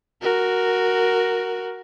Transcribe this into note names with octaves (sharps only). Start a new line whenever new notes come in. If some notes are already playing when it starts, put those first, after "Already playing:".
F#4 A#4